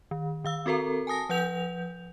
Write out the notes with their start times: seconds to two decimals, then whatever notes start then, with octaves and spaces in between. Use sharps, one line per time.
0.11 D#3
0.44 D#3 F5 E6
0.66 C4 F#4 A4 A#4 A#5
1.07 G#5 A5 D#6 A#6
1.29 F3 B4 F#5 G6 F7